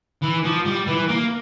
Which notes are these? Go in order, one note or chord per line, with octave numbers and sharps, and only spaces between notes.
E3
F3
G3
E3
A#3